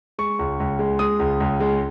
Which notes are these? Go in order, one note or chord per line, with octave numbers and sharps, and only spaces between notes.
G#3 C#6
C#2
C#2
G#3
G#3 D#6
C#2
C#2
G#3